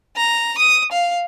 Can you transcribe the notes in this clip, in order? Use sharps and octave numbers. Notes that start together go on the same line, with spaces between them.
A#5
D#6
F5